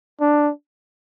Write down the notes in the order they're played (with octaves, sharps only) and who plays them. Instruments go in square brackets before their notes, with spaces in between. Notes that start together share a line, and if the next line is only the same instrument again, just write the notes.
[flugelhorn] D4